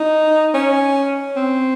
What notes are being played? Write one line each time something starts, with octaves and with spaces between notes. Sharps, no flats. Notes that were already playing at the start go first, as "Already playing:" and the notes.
Already playing: D#4
C#4
C4